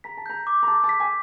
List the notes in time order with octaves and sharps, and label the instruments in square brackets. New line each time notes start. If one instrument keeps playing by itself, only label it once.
[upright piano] A#5 [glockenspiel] B6
[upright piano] A5
[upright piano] A#5 [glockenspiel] G6
[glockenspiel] D6
[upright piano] A#5
[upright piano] A5 [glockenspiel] D6
[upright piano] A5
[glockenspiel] B6
[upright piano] G#5